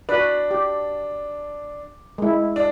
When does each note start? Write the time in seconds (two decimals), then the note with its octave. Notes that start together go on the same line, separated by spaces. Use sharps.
0.09 D4 F#4 B4
0.51 G4
2.18 G#3 E4
2.56 D4